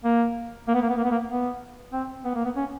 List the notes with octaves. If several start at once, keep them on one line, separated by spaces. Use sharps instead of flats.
A#3
A#3
B3
A#3
B3
A#3
B3
A#3
B3
C4
B3
A#3
B3
C#4